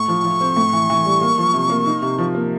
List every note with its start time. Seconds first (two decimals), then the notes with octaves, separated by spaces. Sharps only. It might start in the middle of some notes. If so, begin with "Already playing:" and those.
Already playing: A2 C#6
0.08 F3
0.25 F3
0.41 C4
0.57 A2
0.73 E3
0.90 E3
1.05 G3
1.22 A#3
1.38 F3
1.54 C3
1.70 A#3
1.86 D#4
2.02 C3
2.18 F3
2.35 A#3